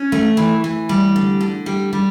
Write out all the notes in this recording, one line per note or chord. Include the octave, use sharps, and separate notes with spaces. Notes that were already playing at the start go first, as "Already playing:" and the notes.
Already playing: C#4
A3
E3
E3
G3
D3
D3
G3
G3